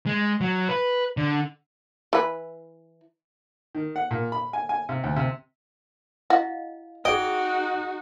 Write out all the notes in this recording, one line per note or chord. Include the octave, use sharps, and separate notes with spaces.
G#3
F#3
B4
D3
E3 B4
D#3
F#5
A#2
B5
G#5
G#5
C3
D2
C3
E4 F#4 D#5 F5
D#4 F#4 G#4 D5 D#5 G5